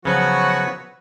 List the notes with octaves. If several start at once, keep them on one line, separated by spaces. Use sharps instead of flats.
C#3 F3 F#3 B3 F#4 B4 C#5